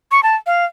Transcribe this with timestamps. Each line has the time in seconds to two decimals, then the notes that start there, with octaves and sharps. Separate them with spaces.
0.11 C#6
0.23 A5
0.47 F5